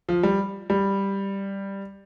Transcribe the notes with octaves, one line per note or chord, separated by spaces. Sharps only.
F3
G3
G3